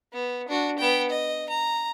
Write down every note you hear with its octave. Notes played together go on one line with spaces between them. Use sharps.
B3
D4 F#4
B3 G5
D#5
A#5